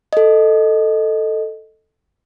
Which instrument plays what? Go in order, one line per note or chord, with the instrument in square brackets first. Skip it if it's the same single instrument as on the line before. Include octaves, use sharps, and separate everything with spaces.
[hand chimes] A4 D#5